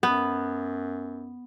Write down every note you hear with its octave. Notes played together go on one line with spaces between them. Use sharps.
F#2 B3